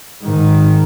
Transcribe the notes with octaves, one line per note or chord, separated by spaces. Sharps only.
G#2 D#3